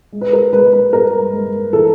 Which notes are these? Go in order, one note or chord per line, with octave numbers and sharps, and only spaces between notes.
G#3
B4
A#4
G#3 B4
B4
G2 A#4
G#3
E3 A4